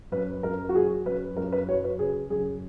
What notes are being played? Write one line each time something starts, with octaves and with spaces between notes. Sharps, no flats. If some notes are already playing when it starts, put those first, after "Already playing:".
F#2 B4
F#2 A#4
F#4
F#3 G#4
F#2 B4
F#2 A#4
B4
F#3 C#5
B4
C#3 G#4
F#2 G#4